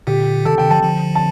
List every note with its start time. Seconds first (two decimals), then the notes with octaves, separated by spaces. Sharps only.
0.07 A#2 D3 G4
0.45 C3 D#3 A4
0.58 C3 D#3 G5
0.70 D3 F3 A5
0.83 D3 F3
1.15 A5